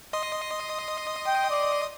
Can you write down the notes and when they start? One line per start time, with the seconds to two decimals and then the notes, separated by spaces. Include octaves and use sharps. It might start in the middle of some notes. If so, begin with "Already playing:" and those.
0.13 D#5 C6 D#6
1.27 G5
1.50 D5